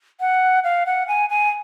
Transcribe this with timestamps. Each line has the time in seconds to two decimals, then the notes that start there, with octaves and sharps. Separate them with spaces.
0.20 F#5
0.64 F5
0.86 F#5
1.08 G#5
1.30 G#5